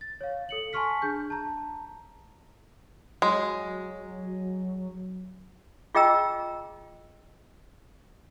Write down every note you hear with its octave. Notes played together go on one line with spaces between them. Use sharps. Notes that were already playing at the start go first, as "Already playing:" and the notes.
A6
C#5 F5
A4 C#7 F#7
G#5 A5 C6 C#6 F6 B6
D4 G#4 G6
A5 A#5
F#3 G#3
F4 G#4 D#5 G5 A#5 E6